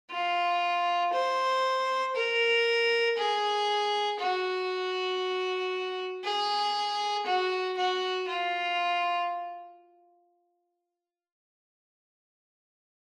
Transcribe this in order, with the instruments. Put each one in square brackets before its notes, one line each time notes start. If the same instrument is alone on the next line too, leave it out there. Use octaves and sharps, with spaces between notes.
[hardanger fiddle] F4
C5
A#4
G#4
F#4
G#4
F#4
F#4
F4